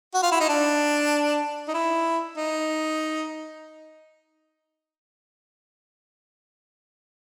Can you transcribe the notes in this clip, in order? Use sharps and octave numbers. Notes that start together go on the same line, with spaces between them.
F#4
F4
E4
D#4
D4
D#4
E4
D#4